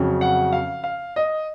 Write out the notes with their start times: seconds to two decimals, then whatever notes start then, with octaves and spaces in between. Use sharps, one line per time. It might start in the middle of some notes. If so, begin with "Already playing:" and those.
Already playing: F2 C#3 F#3
0.21 F#5
0.52 F5
0.84 F5
1.16 D#5